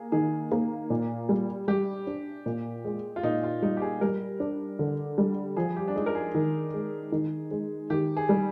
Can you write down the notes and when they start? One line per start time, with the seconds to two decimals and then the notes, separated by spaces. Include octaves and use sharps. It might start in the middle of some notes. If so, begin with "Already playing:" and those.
Already playing: A#3 G#4
0.12 D#3 G#4
0.52 A#3
0.90 A#2
1.29 G3
1.68 G3 G4
2.07 D4
2.46 A#2
2.85 G#3
3.16 F4
3.23 A#2 D#4
3.43 F4
3.62 G3 D#4
3.77 G4
3.82 G#4
4.01 G3 A#4
4.40 D4
4.79 D3
5.18 G3
5.57 F3 G#4
5.76 G4
5.88 D4
5.96 G#3 D#4
6.06 A#4
6.15 G#4
6.35 D#3
6.74 G#3
7.12 D#3
7.51 G#3
7.90 D#3 G4
8.17 G#4
8.29 G3